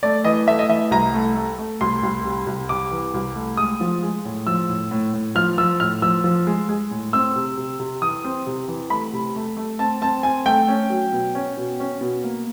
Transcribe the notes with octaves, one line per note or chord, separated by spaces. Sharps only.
A3 D5
E3 D#5
A3 E5
D#5
E3 E5
C2 A#5
A3
A3
A3
C2 C6
C2
C3
C2
C3 D6
E3
C2
A3
G#3 D#6
F3
G#3
A2
F3 E6
A2
A2
A2
F3 F6
F3 E6
A2 F6
F3 E6
F3
G#3
G#3
A2
C4 E6
C3
C3
C3
E3 D#6
C4
C3
E3
A3 B5
C3
A3
A3
C4 A5
C4 A5
C4 G#5
A3 G5
C#4
F#3
B2
C#4
B2
C#4
B2
A#3